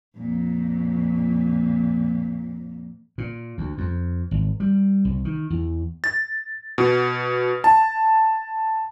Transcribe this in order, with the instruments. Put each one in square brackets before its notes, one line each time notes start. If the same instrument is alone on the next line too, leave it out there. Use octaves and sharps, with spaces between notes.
[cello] F2 A#2
[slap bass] A#2
D2
F2
G#1
G3
C2
D#3
E2
[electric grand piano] A6
B2
A5